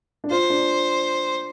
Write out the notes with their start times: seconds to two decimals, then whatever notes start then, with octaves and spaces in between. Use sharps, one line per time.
0.24 D4
0.30 F4 C5
0.50 D4